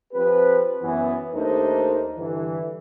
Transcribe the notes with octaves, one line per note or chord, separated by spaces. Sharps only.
F3 C4 G4 B4
F#2 E3 B3
D#2 A3 D4 D#4 A#4 C5
G2 D3 E3